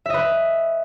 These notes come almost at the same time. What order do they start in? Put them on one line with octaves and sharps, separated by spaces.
E5 D#5 B4